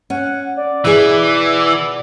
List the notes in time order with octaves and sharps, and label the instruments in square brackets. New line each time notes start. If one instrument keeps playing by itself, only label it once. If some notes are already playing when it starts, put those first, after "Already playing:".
[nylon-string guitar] C#4 [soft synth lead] F#5
[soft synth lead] D5
[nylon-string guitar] B2 F#4 G#4 [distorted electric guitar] E3